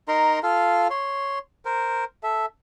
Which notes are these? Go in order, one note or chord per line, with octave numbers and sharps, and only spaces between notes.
D#4 A#4 A#5 C6
F4 A4 F5
C#5 C6
A#4 C5
A4 E5